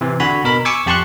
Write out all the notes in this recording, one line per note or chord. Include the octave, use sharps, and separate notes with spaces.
C3 E3
D3 F#4 G#5 B5
B2 A#4 B5
G#5 C#6 D6 E6 G#6
F2 G4 A5 C6 C#6 F#6